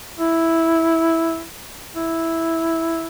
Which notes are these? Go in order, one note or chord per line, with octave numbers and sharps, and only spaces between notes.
E4
E4